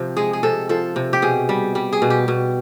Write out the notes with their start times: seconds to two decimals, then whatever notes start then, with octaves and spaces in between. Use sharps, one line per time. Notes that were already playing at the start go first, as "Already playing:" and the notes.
Already playing: C3 F3
0.17 G#3 G#4
0.33 G#4
0.43 C3 A4
0.69 F3 A4
0.96 C3
1.13 G4
1.22 B2 G#4
1.49 G3
1.75 G3
1.93 G#4
2.02 B2
2.10 G4
2.28 B2